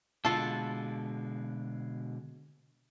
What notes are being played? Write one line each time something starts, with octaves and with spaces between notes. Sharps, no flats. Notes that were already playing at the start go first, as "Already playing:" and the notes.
B2 D3 G#3 F4 A4